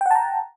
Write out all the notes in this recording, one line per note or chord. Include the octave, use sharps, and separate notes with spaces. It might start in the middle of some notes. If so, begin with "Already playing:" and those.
F#5 G5 A5 A#5